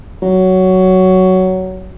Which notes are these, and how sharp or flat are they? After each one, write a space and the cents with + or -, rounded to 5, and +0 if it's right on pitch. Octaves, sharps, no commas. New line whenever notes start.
F#3 +10